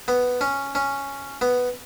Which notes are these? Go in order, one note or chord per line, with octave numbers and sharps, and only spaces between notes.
B3
C#4
C#4
B3